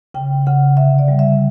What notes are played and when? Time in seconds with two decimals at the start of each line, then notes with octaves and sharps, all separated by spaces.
0.14 C#3 G5
0.47 C#3 F#5
0.77 D3 E5
0.99 D5
1.08 G3
1.19 E5